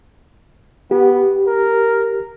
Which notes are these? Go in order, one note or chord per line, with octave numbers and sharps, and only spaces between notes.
B3 G4
A#4